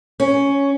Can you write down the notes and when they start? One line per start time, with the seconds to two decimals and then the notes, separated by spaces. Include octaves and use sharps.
0.20 C#4